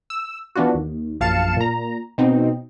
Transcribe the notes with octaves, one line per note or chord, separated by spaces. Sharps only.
E6
E3 B3 D4 F4 F#4
D#2
A#1 F#2 F5 A5 C#7 E7
A#2 A#5
B2 C4 D#4